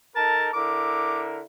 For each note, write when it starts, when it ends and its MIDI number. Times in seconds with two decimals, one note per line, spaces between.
0.16 0.50 63
0.16 0.50 69
0.16 0.50 70
0.16 0.48 81
0.54 1.42 50
0.54 1.42 64
0.54 1.42 70
0.54 1.22 86